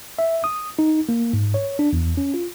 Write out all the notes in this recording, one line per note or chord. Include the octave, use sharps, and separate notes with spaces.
E5
D#6
D#4
A#3
G#2
C#5
D4
E2
C#4
F4